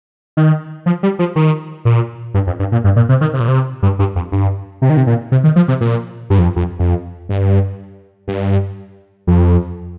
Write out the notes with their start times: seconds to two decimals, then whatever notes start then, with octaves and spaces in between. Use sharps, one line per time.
0.37 D#3
0.86 F3
1.03 G3
1.19 F3
1.36 D#3
1.85 A#2
2.34 G2
2.47 F2
2.59 G2
2.72 A#2
2.84 G2
2.96 A#2
3.09 C3
3.21 D#3
3.34 C3
3.40 A#2
3.48 C3
3.83 G2
3.99 G2
4.16 F2
4.32 G2
4.82 C3
4.90 D#3
4.97 C3
5.07 A#2
5.32 C3
5.44 D#3
5.56 F3
5.68 C3
5.81 A#2
6.30 G2
6.39 F2
6.56 F2
6.79 F2
7.29 G2
8.28 G2
9.27 F2